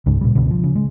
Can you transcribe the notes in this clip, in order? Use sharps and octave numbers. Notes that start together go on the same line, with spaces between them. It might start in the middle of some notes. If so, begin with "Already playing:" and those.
C#2 G#2 C#3 G#3
A#2 G3
C#2 B2 D3
F3
C#3
G#3